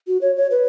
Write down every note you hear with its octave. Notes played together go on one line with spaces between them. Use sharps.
F#4
C#5
C#5
B4